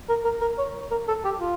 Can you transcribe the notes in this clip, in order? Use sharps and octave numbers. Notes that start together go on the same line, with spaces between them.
A#4
A#4
A#4
C#5
A#4
A4
G4
F4